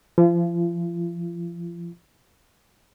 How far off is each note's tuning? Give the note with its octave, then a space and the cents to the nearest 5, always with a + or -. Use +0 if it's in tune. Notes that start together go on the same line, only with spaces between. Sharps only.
F3 -30 F4 -40